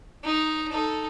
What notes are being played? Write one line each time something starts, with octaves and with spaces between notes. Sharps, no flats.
D#4
D#4 A4